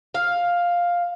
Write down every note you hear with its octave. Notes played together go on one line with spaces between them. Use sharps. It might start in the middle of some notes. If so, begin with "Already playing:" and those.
F5